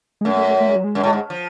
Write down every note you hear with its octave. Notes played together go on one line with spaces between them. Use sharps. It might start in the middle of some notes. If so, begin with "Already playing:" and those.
G#3
F#2 A3
A3
A3
A3
G#3
F#3
G#3
F#2
A2
G#2
F3